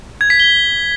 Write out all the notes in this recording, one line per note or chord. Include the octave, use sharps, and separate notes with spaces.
G#6
B6
G7